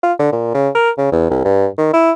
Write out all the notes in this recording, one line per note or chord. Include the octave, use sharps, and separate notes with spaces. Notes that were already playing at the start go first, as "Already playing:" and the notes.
F4
D3
A#2
C#3
A#4
C#3
E2
C2
G2
D#3
E4